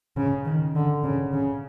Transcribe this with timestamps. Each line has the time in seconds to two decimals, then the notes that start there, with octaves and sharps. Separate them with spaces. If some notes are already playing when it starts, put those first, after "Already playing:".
0.17 C#3
0.45 D#3
0.75 D3
1.04 C#3
1.33 C#3